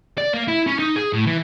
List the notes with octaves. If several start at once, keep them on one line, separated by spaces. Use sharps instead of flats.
D5
A#3
E4
C#4
D#4
G#4
A2
E3